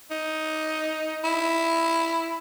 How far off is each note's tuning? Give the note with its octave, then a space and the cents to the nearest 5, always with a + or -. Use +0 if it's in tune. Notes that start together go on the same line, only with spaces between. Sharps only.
D#4 +10
E4 +5